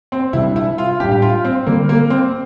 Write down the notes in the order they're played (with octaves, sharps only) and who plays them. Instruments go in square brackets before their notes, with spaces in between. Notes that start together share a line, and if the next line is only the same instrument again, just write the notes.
[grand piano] C4
[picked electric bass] C3 G3 D4 [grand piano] E4
[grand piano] E4
F4
[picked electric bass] A2 G3 D4 [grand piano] G4
[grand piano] G4
F4
C4
[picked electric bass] D3 G3 C4 [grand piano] A#3
[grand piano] A#3
C4